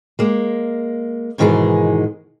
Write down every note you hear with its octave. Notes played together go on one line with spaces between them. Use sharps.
G#3 A#3
G#2 B2 D#3 E3 G#3 G#4